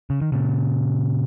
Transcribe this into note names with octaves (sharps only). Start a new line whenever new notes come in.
C#3
D#3
A#2 C#3